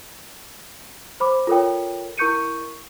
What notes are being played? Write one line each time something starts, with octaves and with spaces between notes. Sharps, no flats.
C5 B5 D6
F4 A4 A#4 C#5 G5
E4 A#4 C#6 G6 C#7 D#7